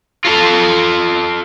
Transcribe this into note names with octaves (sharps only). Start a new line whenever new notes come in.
F4 A4